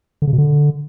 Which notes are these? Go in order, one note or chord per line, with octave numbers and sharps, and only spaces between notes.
D3
C#3
B2
D3